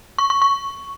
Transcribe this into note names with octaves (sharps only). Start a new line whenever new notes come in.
C#6
C#6
C#6